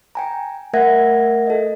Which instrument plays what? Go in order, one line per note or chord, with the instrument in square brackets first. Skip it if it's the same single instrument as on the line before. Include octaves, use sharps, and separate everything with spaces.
[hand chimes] G5 G#5 A#5
A3 A#4 E5 F#5 G#6 A#6
A4 D#5